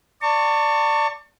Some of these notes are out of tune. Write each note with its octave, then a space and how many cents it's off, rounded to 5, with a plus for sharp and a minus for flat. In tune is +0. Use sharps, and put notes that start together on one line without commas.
D5 +0 A5 +35 C#6 +0